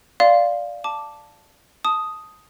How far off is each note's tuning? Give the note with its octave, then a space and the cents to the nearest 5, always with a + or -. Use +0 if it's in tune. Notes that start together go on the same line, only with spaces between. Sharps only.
D5 +0 F5 +0 C6 +0
A5 +5 D6 +0
A5 +0 D#6 +0